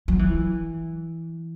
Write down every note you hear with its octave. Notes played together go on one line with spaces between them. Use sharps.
F#3
E3